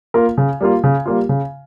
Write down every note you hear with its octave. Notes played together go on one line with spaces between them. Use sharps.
A#3 F4 A#4
C#3
G3 A#3 F4
C#3
G3 A#3 F4
C#3